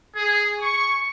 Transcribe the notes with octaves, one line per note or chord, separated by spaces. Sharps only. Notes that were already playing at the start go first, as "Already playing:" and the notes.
G#4
C#6